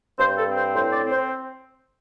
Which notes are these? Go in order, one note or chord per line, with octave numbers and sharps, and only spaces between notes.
G2 C5
A4
C4
C5
A2 C5
D5
C4
C5